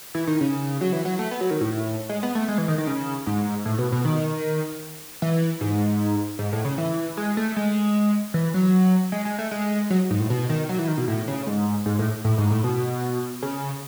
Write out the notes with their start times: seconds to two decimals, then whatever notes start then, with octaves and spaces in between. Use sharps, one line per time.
0.15 E3
0.27 D#3
0.41 C#3
0.81 F#3
0.93 E3
1.05 F#3
1.19 A3
1.31 B3
1.41 F#3
1.50 D#3
1.61 A2
2.09 G#3
2.23 B3
2.35 A3
2.48 G#3
2.58 E3
2.68 D#3
2.78 D#3
2.87 C#3
3.27 G#2
3.65 A2
3.78 B2
3.92 B2
4.05 D#3
5.22 E3
5.61 G#2
6.39 G#2
6.53 A2
6.65 C#3
6.78 E3
7.17 G#3
7.37 A3
7.56 G#3
8.34 E3
8.54 F#3
9.12 G#3
9.25 G#3
9.38 A3
9.51 G#3
9.90 F#3
10.11 G#2
10.20 A2
10.30 B2
10.49 D#3
10.69 F#3
10.79 E3
10.88 D#3
10.98 B2
11.08 A2
11.28 C#3
11.47 G#2
11.86 G#2
11.99 A2
12.24 A2
12.38 G#2
12.51 A2
12.64 B2
13.43 C#3